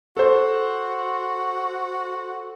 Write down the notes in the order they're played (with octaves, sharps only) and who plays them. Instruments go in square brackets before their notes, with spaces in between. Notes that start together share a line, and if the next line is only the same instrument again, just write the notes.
[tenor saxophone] F#4 [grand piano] A4 C5